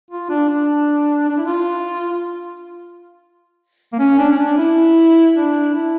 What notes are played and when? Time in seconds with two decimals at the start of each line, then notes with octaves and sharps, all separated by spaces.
0.11 F4
0.30 D4
0.49 D4
1.29 D4
1.38 E4
1.46 F4
3.93 A#3
3.99 C#4
4.18 D4
4.32 C#4
4.38 D4
4.58 E4
5.35 D4
5.74 E4